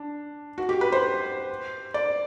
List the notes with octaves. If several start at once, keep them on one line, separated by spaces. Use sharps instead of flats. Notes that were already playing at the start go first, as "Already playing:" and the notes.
Already playing: D4
F#4
G4
B4
C5
D5